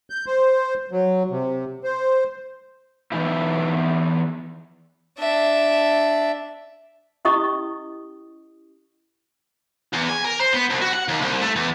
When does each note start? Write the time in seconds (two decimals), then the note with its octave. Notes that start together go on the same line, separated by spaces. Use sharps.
0.10 G6
0.27 C5
0.92 F#3
1.31 C3
1.84 C5
3.12 E2 A#2 E3 D#4 E4
5.19 D4 E5
7.25 C#4 E4 G4 D#5 C#6 D#6
9.93 E2
10.09 G#5
10.24 A#4
10.40 C5
10.54 B3
10.70 C2
10.82 F#4
10.93 F#5
11.08 D#2
11.21 C2
11.42 A3
11.56 E2